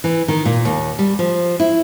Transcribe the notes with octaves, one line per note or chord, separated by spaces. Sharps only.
E3
D#3
A#2
D#2
G3
F3
E4